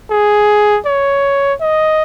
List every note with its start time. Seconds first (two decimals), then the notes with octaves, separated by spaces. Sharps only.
0.10 G#4
0.86 C#5
1.61 D#5